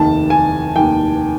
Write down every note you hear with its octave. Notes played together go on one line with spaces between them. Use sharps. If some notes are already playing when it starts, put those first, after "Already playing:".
Already playing: F1 D#2 D#3 A5
G#5
F1 D#2 D#3 G5